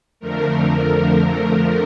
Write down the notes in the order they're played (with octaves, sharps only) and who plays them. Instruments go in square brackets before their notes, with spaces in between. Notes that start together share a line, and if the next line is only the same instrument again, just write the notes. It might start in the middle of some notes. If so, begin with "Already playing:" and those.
[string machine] F2 D3 F3 A3 A#4